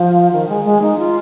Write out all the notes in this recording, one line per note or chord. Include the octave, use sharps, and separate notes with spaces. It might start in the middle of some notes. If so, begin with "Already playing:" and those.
Already playing: F3
D#3
G#3
G#3
D#4
F4